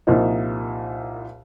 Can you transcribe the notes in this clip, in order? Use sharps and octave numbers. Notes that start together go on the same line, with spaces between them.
C2 A#2 F3 A#3 D#4